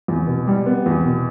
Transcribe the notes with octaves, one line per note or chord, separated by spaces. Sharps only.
E2
B2
G3
B3
E2
B2